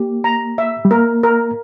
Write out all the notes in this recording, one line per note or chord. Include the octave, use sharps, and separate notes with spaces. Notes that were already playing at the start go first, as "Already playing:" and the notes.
Already playing: A#3 G4
A#5
E5
G3
A#3 A#4
A#4